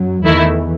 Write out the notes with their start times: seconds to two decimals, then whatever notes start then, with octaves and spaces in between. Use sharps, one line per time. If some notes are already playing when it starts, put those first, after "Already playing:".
Already playing: F#2 F#3
0.25 E2 D#3 E3 A3 E4